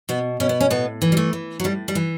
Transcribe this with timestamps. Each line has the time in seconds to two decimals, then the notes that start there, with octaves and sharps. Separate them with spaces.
0.09 B2 B3
0.40 B2 C#4
0.49 B3
0.61 C#4
0.71 A2 B3
1.02 E3
1.12 G3
1.17 A3
1.33 E3
1.60 F#3
1.64 A2 G3
1.88 G3
1.95 E3